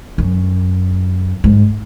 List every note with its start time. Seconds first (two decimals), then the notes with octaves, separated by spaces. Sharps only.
0.18 F#2
1.44 G#2